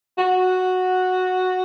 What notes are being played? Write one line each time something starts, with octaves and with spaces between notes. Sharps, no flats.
F#4